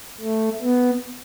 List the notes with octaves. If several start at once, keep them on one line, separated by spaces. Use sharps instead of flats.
A3
B3